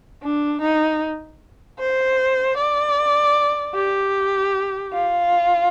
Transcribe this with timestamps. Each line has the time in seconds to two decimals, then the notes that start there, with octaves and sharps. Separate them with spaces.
0.22 D4
0.61 D#4
1.79 C5
2.58 D5
3.75 G4
4.93 F4